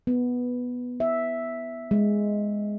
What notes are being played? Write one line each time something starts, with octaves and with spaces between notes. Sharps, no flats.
B3
E5
G#3